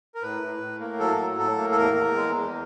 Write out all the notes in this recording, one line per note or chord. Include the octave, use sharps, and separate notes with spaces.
A#4
A2 B4
A2
A2
A#3
F#3 A4
A2
A2 A4
A#3
A4
E2 A#4
E2
G#3
E2